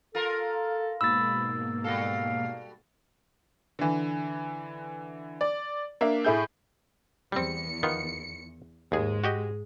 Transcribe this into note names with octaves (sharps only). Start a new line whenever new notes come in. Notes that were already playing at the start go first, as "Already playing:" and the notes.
F4 A4 A#4
G#2 B2 A#3 B5 E6 A6
G3 F#4 A4 F5
D3 E3
D5
A#3 D4 E5
A2 A3 E4 G#4 G6
E2 G3 C4 C#7
D#3 B3 F4
D#2 G#2 G#3 G#4
F#4 G4 D#5